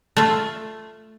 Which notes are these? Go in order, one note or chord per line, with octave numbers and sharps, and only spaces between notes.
A3 F4